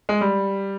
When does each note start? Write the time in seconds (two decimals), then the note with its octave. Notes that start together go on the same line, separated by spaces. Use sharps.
0.09 G#3
0.21 G3